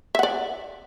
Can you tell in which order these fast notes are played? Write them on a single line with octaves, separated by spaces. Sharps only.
E5 F#5 D5